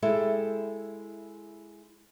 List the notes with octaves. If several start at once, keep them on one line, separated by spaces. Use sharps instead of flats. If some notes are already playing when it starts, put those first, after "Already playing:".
G#3 E4 G4 A4 E5